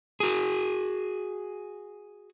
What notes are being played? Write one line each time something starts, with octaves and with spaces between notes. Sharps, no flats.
F#4 G#4